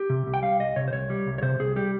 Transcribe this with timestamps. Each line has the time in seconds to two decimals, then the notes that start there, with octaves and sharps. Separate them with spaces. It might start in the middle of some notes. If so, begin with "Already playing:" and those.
Already playing: G4
0.10 C3
0.26 C2
0.34 G5
0.43 G3 F5
0.59 C2 D#5
0.76 C3 C#5
0.88 C5
0.93 C2 C#5
1.10 G3
1.26 C2
1.38 C#5
1.42 C3 C5
1.59 C2 G#4
1.76 G3 G4